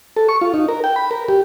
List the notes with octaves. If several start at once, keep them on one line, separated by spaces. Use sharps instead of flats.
A4
C#6
F4
D#4
A#4
G5
B5
A#4
G4